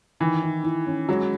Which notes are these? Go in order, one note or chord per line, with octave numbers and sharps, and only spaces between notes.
D#3 E3
E4
E4
C#4
F#3 G#3